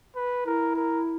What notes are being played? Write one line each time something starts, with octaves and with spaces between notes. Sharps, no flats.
B4
E4 A#4
A#4